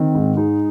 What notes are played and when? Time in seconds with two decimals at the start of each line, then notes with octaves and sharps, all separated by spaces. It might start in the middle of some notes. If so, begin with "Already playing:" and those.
Already playing: D#3 C4
0.15 G#2
0.37 G#3 D#4